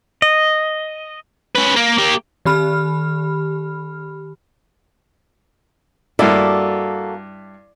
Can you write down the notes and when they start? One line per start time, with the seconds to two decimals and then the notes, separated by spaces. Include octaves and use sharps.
0.22 D#5
1.55 C#4 B4
1.76 A#3
1.98 A#3 G4
2.45 D#3 G4 B5 F6
6.19 G2 A#3 E4 F#4 A4 D5